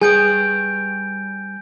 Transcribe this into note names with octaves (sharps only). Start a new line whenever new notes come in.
G3 G#4 B4 G5 G#5 G6 D7